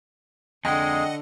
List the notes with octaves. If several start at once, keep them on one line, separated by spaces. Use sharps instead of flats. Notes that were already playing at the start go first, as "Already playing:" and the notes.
F2 D3 G#3 D#5 F#5 G5